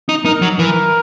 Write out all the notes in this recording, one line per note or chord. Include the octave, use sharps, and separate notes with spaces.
D#4
D#4 A#4
F#3
E3 A#4